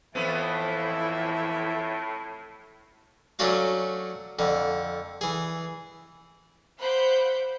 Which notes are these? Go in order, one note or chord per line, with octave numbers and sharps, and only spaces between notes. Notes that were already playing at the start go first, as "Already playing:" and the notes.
F2 A2 E3 F3 B3 E4 E5
F#3 A3 C#4 D4 F#4 F5
F2 D3
E3 G#4
C5 F5 F#5 B5 D6 G6